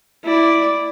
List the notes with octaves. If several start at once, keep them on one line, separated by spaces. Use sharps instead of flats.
E4 D5